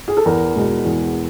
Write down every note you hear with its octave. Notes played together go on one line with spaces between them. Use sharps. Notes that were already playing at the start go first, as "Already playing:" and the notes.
G#4
A4
E2 A#4
B2 G#3
E2